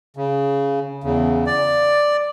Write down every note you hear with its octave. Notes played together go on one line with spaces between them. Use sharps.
C#3
E2 C#3
D5